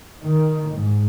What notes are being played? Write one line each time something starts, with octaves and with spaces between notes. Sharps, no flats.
D#3
G#2